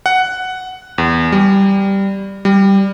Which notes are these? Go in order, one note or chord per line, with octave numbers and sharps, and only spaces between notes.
F#5
E2
G3
G3